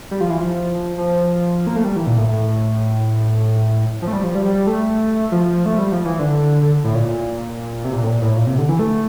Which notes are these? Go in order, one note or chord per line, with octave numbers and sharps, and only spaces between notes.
G3
F3
E3
F3
F3
A#3
A3
G3
E3
A#2
A2
A2
F3
A3
G3
F3
G3
G3
A3
F3
A3
G3
F3
E3
D3
D3
A2
A#2
C3
A#2
A2
A#2
A2
A#2
C3
D3
E3
A3